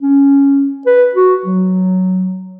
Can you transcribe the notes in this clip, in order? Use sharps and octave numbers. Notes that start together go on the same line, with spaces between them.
C#4
B4
F#4
F#3